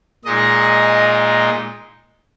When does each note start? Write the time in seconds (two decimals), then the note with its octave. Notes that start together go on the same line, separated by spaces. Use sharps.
0.25 A#2 G#3 D#4 D#5